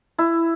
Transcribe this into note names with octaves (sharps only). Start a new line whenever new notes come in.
E4